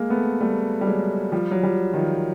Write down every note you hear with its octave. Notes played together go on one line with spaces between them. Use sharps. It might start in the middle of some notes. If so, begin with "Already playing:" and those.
Already playing: G#3 A#3
A3 B3
G3 A3
G3
F#3 G#3
F3 G3
F#3
F3 G3
D#3 F3